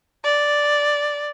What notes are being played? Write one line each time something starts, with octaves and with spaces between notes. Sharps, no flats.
D5